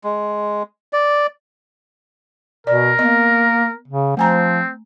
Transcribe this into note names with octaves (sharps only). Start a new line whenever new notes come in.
G#3
D5
B2 A#4 D5
A#3 B3 D#5
C#3
F3 A3 C4 G#5 A#5